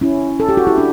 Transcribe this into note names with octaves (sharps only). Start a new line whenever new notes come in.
C#4 E4
A4
G4
F#4
E4 G4
D4 F#4